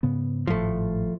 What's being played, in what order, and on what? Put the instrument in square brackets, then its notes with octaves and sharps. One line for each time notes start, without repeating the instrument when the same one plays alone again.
[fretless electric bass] G#2 C#3 B3
[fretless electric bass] G#1 A2 [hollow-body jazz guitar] F3 A3